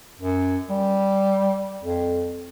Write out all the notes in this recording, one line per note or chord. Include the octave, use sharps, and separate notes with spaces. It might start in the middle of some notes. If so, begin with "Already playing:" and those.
F#2
G3
F2